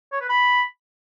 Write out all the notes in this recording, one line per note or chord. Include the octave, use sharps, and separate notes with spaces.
C#5
B4
B5